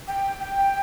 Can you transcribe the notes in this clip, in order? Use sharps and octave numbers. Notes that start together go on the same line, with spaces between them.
G5
G5